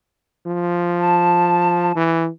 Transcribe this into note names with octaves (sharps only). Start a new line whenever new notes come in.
F3
A5
E3